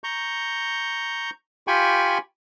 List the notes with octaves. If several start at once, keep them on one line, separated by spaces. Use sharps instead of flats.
A#5 C#6 G6
F4 G4 G5 G#5 B5 C#6